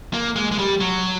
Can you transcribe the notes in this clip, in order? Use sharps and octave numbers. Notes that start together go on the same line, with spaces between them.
A#3
G#3
G#3
G3
F#3